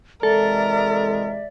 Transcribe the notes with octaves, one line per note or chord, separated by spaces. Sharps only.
C3 E3 G#3 A4 A#4 D5 E5